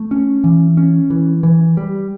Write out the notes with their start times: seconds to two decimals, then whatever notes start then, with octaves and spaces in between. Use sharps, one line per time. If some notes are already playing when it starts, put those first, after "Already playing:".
Already playing: A3
0.11 C#4
0.44 E3
0.77 C#4
1.10 E3
1.43 E3
1.77 G3